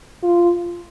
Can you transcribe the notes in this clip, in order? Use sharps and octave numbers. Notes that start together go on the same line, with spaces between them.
F4